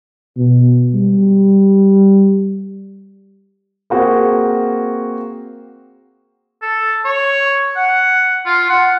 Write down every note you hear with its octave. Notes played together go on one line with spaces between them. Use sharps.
B2
G3
A#3 C4 F#4 G#4
A4
C#5
F#5
F4
F#5